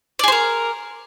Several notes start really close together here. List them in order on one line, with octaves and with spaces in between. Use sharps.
D5 G#4 C5 A#4